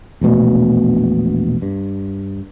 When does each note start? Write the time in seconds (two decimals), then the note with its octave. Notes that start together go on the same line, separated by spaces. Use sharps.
0.21 E1 A#1 B2 A3
1.62 G2